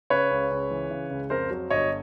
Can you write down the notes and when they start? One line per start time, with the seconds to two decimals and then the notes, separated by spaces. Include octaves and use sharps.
0.10 C#3 B4 C#5
0.31 C#2
0.51 C#2
0.71 E3
0.91 C#3
1.11 C#2
1.30 F2 A#4 C5
1.51 F#3
1.70 G1 C#5 D#5